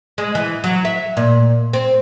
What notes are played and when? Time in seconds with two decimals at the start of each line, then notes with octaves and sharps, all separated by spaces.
0.18 G#3
0.35 E3
0.64 F#3
0.85 E5
1.17 A#2
1.73 C4